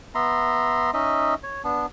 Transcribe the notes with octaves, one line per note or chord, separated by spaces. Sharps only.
B3 E5 A#5 C6
C#4 D#4 D#5 E5
C#5
B3 D4